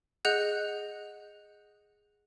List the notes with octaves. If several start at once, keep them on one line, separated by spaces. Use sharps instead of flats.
G#4 D#5 F#5 F#6 G6